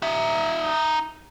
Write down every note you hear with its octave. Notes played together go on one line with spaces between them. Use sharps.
D#4 E5